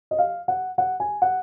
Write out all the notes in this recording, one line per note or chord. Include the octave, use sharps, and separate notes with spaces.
D#5
F5
F#5
F#5
G#5
F#5